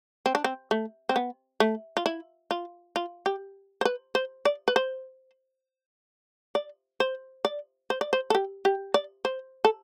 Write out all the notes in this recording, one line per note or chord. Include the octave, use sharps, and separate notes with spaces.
C4
D4
C4
A3
C4
B3
A3
F4
E4
F4
F4
G4
C5
B4
C5
D5
B4
C5
D5
C5
D5
C5
D5
C5
A4
G4
G4
D5
C5
A4